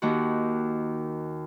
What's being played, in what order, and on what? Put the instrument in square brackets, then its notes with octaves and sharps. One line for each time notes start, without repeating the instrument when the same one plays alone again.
[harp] D#2 D#3 F#4